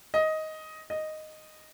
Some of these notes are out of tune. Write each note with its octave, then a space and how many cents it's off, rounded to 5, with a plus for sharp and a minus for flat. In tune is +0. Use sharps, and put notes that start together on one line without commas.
D#5 +10
D#5 -5